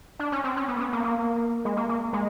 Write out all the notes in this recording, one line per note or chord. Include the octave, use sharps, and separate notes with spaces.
D4
C#4
C4
C#4
B3
A#3
B3
A#3
A#3
G#3
A#3
A#3
G#3